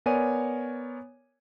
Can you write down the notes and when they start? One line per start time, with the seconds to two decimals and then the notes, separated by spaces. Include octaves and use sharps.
0.06 B3 A#4 C#5 D5 G#5 D#7